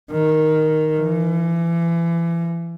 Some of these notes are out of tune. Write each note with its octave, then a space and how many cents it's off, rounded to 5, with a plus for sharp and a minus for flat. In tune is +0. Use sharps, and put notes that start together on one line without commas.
D#3 +0
E3 +35